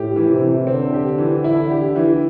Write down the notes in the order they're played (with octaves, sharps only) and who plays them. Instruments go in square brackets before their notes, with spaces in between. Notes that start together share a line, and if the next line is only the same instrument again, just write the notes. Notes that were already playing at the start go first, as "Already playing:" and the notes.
Already playing: [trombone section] A2 [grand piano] G4
[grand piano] E3
[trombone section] C3
[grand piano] E3
[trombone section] D3 [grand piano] C4
[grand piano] G4
E3
E4
G4
E3